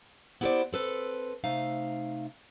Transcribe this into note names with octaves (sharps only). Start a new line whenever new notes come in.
B3 E4 G4 A#4 C5 D5
C4 A4 B4
C3 A3 D#4 F5